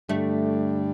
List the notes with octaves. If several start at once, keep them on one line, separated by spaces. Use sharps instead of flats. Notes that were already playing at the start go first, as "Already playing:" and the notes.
G2 D3 G3 A3 D4